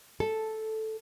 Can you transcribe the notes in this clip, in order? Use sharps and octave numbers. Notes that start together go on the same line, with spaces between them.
A4